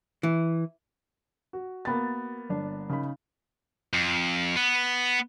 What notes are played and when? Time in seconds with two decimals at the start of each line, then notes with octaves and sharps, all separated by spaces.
0.23 E3
1.53 F#4
1.85 A#3 B3 A6
2.49 G1 D4
2.89 C#3 D#4 B5
3.93 F2
4.56 B3